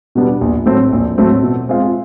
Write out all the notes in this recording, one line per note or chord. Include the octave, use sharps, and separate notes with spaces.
B2 G3 B3 D4
A#1
A2 F#3 A3 C4
A#1
A2 F#3 A3 C4
B2
G#3 C4 F4